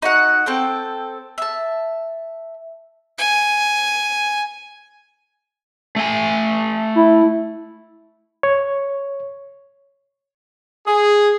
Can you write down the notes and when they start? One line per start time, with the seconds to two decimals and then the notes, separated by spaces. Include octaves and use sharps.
0.02 D#4 F#4 F#5
0.46 C4 A4 G5
1.38 E5 A5
3.18 G#5
5.96 A3 G#5
6.95 E4
8.43 C#5
10.87 G#4